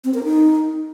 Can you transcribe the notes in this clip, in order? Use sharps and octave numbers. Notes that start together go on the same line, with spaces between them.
C4
A#4
D#4